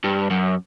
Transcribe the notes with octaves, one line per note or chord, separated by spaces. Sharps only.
G2
F#2